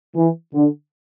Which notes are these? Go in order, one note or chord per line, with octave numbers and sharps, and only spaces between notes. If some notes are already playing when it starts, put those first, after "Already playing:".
E3
D3